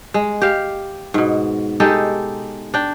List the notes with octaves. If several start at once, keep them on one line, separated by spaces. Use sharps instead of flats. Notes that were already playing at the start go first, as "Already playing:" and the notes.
G#3
G4 F5
G#2 B2
G#3 D#4 G4 A4
D4 G5